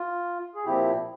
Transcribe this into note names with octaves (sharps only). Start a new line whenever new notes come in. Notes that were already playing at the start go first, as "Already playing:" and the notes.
Already playing: F4
G#4
A#2 F3 C4 E4 G4